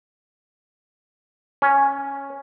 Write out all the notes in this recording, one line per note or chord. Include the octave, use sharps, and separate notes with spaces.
C#4